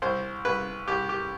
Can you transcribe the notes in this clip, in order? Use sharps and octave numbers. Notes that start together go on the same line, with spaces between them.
C2 C5
C2 B4
C2 G4
G4